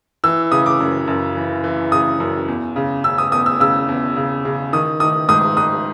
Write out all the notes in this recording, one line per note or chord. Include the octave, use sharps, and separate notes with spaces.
E3 E6
C#3 D#6
D6
F#2
F#2
E3
E3
C#3 D#6
F#2
E2
C#3
C#3 E6
D#6
E2 D#6
E6
C#3 E6
E2
C#3
C#3
D#3 D#6
D#3 D#6
G#2 D#6
G#2 D#6